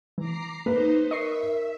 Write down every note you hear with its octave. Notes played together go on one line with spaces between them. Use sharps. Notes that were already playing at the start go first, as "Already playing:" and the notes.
E3 A#5 D6 C7
A#3 D#4 B4 C5
A#4 D#5 E5 C#6 C7